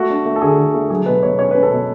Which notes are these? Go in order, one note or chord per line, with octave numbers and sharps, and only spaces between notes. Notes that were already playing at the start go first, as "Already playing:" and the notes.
Already playing: A3 F#4
D4
A3
A4
D3 G#4
D3
A3
F#3 G#4
B2 B4
B2 C#5
C#4 C#5
B4
C#4
A4
B2